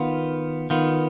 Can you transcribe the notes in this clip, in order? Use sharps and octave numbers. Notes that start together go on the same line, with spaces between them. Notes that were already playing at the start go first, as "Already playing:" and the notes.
Already playing: D#3 B3 F4
D#3 B3 F4